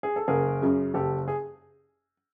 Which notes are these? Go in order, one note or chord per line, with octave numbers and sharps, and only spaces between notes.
G#4
A4
F#1 G#4 A#4
F#2 C#3
F#1 G4 A4
G#4